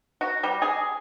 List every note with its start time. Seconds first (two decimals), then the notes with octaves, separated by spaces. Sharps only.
0.21 F#4
0.43 G3
0.62 G#4